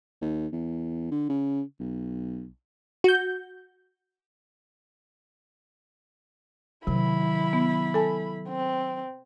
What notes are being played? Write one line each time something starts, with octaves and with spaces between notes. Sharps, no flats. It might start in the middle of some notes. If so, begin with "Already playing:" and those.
D#2
E2
D3
C#3
B1
F#4 G6
C3 D#3 F#3 E4 B5
B3
A4 G#5 A5
C4